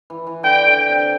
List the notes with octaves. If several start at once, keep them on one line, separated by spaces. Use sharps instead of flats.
E3
E3
D3 G5
D3
G5
C3